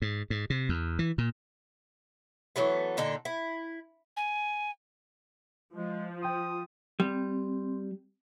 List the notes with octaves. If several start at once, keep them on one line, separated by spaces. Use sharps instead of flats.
G#2
G#2
C3
E2
E3
A#2
E3 F#3 A3 B3
A#2 D3 D#4 A4
E4
G#5
F3 G#3
G5 C6 D#6
G3 C4